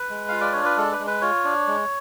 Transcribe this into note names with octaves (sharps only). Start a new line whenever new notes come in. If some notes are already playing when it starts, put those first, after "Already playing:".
Already playing: B4
G#3
F4 F5
D5
D4 C#5
B4
G#3 A4
B4
G#3
B4
F4 C#5
D4
G#3